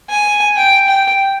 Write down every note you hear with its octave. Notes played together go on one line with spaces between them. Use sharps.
G#5
G5
G5